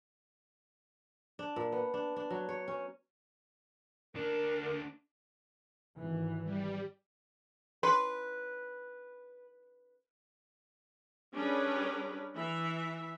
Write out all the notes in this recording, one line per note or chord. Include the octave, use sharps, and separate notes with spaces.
D4
A#2
B3
D4
D4
F#3
C#5
C#4
D2 D4 A#4
G#1 E3
G3
C#4 E4 B4 C6
G3 C#4 D4 G#4 A#4 B4
E3 E5